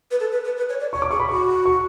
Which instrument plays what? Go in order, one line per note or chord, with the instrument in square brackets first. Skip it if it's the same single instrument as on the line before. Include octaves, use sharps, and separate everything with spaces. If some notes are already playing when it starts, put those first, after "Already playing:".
[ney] B4
A4
B4
B4
B4
C#5
D5
[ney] C#5 [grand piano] C#6
[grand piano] D6
[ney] G#4 [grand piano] C#6
[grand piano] B5
[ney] F#4 [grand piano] C#6
[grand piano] C#6